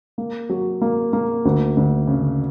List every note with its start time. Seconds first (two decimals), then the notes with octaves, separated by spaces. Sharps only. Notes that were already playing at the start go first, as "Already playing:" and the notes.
0.18 A#3
0.49 F#3
0.81 A#3
1.13 A#3
1.45 D2
1.77 D2
2.07 C#3